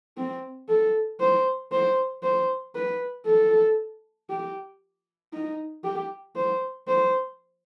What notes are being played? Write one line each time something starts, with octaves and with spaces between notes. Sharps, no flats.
C4
A4
C5
C5
C5
B4
A4
G4
D#4
G4
C5
C5